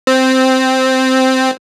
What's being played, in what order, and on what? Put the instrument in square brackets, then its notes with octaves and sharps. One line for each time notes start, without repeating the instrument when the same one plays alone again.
[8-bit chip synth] C4